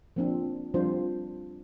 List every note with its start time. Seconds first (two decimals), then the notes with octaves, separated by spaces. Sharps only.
0.16 F3 A#3 C4 D4 F4
0.74 F3 G3 C4 D4 F4 C5